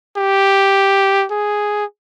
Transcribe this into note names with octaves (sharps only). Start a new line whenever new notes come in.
G4
G#4